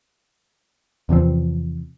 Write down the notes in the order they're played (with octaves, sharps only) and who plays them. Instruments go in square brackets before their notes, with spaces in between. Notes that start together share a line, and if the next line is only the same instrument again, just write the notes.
[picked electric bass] E2 C3 F3 C4